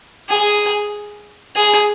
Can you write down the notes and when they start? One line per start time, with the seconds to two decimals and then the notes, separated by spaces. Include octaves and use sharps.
0.30 G#4
1.56 G#4